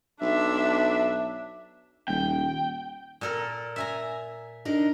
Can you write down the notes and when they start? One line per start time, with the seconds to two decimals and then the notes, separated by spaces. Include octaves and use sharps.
0.22 B1 D4 E5
2.08 D#1 G5
3.21 A#2 A4 A#4
3.76 E5 G#5 A#5
4.65 D4 D#4 A#4